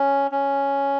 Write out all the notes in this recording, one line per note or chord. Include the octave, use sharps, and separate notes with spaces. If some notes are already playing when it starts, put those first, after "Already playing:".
Already playing: C#4
C#4